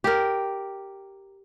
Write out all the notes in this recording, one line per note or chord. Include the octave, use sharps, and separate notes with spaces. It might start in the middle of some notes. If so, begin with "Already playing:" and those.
G4 A#4